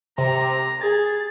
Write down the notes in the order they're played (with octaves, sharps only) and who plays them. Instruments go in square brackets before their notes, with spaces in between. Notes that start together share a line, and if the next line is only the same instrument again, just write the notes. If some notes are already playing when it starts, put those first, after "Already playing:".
[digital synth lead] C3 [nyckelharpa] A#5
[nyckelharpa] G#4 [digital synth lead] A6